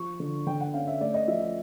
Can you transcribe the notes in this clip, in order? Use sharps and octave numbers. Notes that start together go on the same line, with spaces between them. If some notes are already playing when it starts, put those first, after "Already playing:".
Already playing: F3 C#6
D3
D3 G5
F#5
C#4 F5
E5
A3 D5
D#5
F3 E5
E5